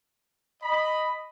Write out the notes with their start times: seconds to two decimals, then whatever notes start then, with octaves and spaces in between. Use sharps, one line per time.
0.63 D#5 B5